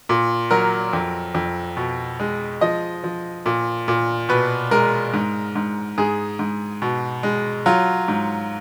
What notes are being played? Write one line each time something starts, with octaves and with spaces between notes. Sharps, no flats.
A#2
F#3 A#4
F2
F2
B2
G#3
F3 D#5
F3
A#2
A#2
B2 B4
G#3 A#4
G#2
G#2
G#2 G#4
G#2
B2
G#3
F#3 F4
G#2